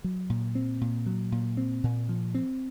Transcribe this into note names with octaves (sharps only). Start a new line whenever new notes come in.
F#3
A#2
C4
A#2
F#3
A#2
C4
A#2
F3
C4